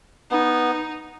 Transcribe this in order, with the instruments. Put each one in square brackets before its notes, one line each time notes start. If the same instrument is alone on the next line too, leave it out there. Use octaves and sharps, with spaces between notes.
[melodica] B3 [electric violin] D#4